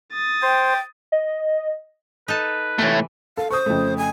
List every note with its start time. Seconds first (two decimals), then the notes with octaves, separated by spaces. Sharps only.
0.13 D#6 A6
0.42 C5 G5
1.12 D#5
2.28 D#4 A4 B4 A5
2.79 A2 C3 E3 A3
3.37 A4 F5
3.51 C5 C#6 D#6
3.66 F2 C#3 A3
3.98 G#5